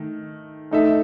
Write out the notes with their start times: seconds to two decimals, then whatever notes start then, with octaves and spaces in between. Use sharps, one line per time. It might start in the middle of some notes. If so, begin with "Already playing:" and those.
Already playing: D#3 A3
0.71 A3 D#4 A4 E5